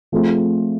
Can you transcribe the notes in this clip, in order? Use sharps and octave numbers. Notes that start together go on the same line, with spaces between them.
F3 A3 C4 F4 G#4